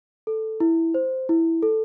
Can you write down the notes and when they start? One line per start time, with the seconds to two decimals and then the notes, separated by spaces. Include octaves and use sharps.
0.27 A4
0.60 E4
0.94 C5
1.29 E4
1.63 A4